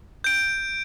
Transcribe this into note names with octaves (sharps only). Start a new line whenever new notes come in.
G6 D7